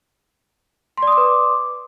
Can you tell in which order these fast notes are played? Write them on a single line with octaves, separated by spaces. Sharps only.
C6 D5 D#6 D6 B4